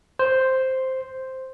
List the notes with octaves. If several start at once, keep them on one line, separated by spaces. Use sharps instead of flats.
C5